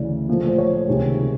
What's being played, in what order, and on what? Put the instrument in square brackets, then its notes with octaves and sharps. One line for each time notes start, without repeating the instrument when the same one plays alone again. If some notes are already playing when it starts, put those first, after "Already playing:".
Already playing: [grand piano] D2 C#3 E3 D5
A#2 F3 A3
C5
C#5
C#2 C3 D#3 G#3